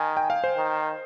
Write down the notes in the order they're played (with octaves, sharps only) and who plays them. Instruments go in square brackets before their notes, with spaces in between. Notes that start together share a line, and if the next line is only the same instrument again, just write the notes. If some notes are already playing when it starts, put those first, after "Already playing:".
Already playing: [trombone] D#3 [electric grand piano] G#5
[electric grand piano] G5
F5
C5
[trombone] D#3